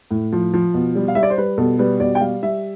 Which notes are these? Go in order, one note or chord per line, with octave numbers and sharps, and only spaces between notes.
A2
F3
F3
B2
G3
F5
G3 E5
D5
C5
G3 B4
B2 A4
G3 B4
B2 D5
G5
G3 F5
G3 E5